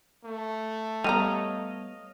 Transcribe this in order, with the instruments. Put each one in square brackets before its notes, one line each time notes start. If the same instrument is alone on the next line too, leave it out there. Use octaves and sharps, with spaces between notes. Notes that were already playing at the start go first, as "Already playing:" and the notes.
[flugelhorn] A3
[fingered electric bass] G3 B3 [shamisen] G4 F#5 A#5 [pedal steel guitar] C#5 D#5 F5